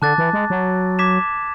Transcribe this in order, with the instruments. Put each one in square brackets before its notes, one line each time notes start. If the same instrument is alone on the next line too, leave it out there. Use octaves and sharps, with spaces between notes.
[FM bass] D3 [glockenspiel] A5 D6 F#6 A6
[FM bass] E3
G#3
F#3
[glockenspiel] D6 G#6 B6 E7